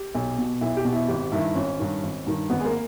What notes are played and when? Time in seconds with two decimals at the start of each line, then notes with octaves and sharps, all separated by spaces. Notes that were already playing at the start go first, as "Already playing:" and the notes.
Already playing: G4
0.15 B1
0.38 B2
0.61 B1 E4
0.77 G4
0.85 B2
0.93 E4
1.08 G#1 G4
1.32 G2 D#3 E4
1.55 G#1 C#4
1.79 G2 D#3
2.03 G#1
2.26 G2 D#3
2.50 G#1 B3
2.60 G#3
2.66 A#3